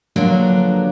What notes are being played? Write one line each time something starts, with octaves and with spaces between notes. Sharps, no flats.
D3 F3 F#3 A#3 B3 D4